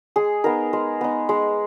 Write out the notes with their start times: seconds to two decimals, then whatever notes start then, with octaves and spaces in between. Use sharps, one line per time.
0.16 G#3 G#4
0.44 B3 D#4 A#4
0.73 G#3
1.01 B3 D#4
1.29 G#3